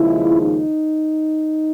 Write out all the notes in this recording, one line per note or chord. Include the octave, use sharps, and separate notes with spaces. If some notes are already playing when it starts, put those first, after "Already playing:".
Already playing: D#2 C#3 F3 G#3 E4
D#4